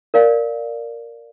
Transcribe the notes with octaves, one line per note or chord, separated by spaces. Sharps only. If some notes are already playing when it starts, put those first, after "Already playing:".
A#4 D5 F5